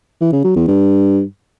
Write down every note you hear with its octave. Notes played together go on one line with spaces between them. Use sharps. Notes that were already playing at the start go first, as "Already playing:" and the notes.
E3
C#3
F#3
E2
G2